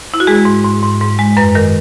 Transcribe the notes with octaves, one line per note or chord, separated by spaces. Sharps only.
E4
F#4
G#3 G#4
G#2
G#2
G#2
G#2
G#3
F#2 B4
D#3 A#4